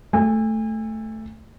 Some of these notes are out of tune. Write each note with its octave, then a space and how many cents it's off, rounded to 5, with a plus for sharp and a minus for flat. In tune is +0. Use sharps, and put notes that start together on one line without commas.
A3 +0 G#5 -40